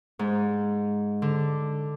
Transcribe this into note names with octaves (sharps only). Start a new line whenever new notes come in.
G#2
D3